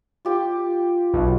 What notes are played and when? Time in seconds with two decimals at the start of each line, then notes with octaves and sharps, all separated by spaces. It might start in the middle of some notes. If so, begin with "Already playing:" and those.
0.25 F4 G4 G5
1.14 B1